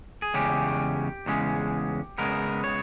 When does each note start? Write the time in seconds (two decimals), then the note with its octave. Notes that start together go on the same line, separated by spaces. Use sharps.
0.22 G#4
0.34 E2 C#3 G#3 C#4 G4
1.26 E2 C#3 G#3 C#4
2.18 C#3 G#3 B3 A#4
2.64 C#5